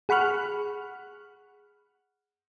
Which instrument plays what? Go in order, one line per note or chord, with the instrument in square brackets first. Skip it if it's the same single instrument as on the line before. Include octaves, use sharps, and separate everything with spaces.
[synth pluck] G#4 F#5 B5 C#6 F6 F#6